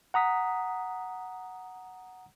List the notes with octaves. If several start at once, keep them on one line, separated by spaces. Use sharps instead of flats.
F#5 A#5 D#6 B6